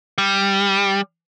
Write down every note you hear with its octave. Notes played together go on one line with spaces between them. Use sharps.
G3